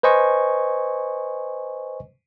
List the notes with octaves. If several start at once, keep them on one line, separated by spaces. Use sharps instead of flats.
B4 C5 D#5 G#5 C#6